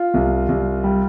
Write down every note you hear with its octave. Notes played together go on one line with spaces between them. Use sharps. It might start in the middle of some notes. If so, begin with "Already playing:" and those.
Already playing: F4
C2
C2
G3